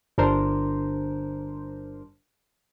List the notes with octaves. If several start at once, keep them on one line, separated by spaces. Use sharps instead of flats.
G1 D4 A#4 C5